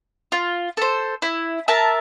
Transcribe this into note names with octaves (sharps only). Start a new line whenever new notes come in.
F4
A4 C5
E4
A#4 E5 A5